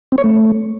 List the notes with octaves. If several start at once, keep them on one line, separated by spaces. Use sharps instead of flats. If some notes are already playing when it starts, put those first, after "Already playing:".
C4
C#5
A3